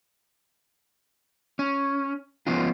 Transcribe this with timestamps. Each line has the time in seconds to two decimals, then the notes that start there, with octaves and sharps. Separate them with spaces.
1.59 C#4
2.47 F3 B3 C#4 F4